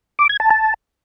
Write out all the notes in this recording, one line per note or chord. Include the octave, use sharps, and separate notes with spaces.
D6
G#6
A5
A5